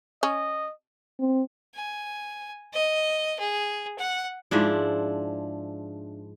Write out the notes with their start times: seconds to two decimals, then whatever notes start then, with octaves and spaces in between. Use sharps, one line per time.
0.23 C#4 D#5
1.20 C4
1.74 G#5
2.73 D#5
3.39 G#4
3.98 F#5
4.51 G#2 F3 D4 E4